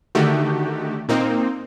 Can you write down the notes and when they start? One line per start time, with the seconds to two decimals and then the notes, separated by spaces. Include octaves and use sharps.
0.15 D3 D#3 A3 F#4 G4
1.09 A#2 A#3 C4 D#4